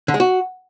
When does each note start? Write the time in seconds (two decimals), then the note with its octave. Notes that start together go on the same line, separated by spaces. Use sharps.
0.08 D3
0.14 G#3
0.20 F#4